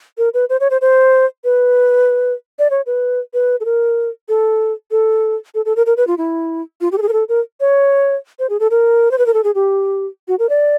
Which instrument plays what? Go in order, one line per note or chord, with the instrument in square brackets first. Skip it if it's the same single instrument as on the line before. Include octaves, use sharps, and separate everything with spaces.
[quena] A#4
B4
C5
C#5
C5
C5
B4
D5
C#5
B4
B4
A4
A#4
A4
A4
A4
A4
A#4
A#4
B4
F4
E4
F4
G4
A4
G#4
A#4
A4
A#4
C#5
C5
G#4
A4
A#4
C5
B4
A#4
A4
G#4
G4
F#4
A#4
D5